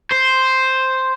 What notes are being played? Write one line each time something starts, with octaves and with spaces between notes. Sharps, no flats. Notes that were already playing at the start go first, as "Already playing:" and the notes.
C5